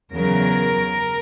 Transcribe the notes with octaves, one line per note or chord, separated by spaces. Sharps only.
E2 C#3 F#3 A#4